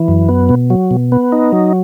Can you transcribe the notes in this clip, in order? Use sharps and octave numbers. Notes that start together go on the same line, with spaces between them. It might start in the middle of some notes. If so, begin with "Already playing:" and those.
Already playing: E3
F#2
B3
B2
F#3
B2
B3
D#4
F#3